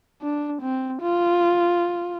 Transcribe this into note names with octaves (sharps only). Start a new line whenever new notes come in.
D4
C4
F4